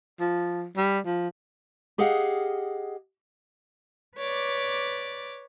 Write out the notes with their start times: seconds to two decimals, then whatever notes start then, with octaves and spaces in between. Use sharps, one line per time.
0.20 F3
0.77 G3
1.05 F3
1.98 G4 G#4 D#5 F5 F#5
4.17 B4 C#5 D5 D6